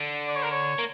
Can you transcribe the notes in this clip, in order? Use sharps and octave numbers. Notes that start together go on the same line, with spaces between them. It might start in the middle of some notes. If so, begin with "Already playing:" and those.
Already playing: D3
D5
C#5
A#4
C#5
A#3